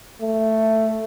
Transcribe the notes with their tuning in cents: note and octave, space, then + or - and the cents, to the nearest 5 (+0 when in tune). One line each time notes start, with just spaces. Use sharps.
A3 +5